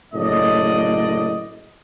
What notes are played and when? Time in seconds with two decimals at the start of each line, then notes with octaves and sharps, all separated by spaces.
0.12 F#1 A2 D3 D5 D#5